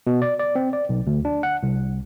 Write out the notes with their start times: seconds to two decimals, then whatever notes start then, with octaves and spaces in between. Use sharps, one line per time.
0.07 B2
0.22 D5
0.40 D5
0.55 C4
0.73 D5
0.89 B1
1.07 D2
1.25 D4
1.43 F#5
1.63 C2